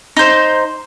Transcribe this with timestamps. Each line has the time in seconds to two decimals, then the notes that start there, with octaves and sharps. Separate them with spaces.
0.17 D#4 C5